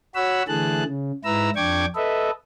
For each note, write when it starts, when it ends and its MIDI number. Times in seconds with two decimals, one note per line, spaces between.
0.15 0.43 66
0.15 0.43 73
0.15 0.43 78
0.15 0.43 83
0.15 0.43 88
0.48 0.84 50
0.48 0.84 52
0.48 0.84 57
0.48 0.84 68
0.48 0.84 81
0.48 0.84 90
0.84 1.12 49
1.24 1.50 44
1.24 1.50 64
1.24 1.50 71
1.24 1.50 82
1.24 1.50 88
1.56 1.85 41
1.56 1.85 62
1.56 1.85 79
1.56 1.85 85
1.56 1.85 86
1.56 1.85 92
1.95 2.31 69
1.95 2.31 71
1.95 2.31 75
1.95 2.31 76